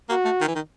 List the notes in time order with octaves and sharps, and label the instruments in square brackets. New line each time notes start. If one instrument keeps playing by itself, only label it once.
[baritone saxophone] A#3 [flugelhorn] F#4
[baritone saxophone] A3
D#3
E3
D#3